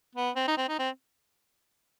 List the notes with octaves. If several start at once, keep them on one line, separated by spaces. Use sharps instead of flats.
B3
C4
D#4
C4
D#4
C4